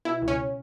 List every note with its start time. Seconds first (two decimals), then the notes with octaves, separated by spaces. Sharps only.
0.05 B2 E4
0.22 C#2
0.28 C#4